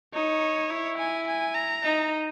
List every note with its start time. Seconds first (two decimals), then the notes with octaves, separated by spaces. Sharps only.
0.14 D#4 C#5
0.70 E4
0.98 G#5
1.27 G#5
1.55 A#5
1.83 D#4